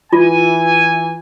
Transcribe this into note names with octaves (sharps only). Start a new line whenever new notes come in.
E3 F4 G#5